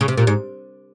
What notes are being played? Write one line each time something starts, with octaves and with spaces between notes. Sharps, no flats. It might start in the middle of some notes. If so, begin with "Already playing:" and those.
C#3
C3
A#2
G#2